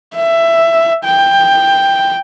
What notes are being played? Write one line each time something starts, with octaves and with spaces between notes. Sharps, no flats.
E5
G5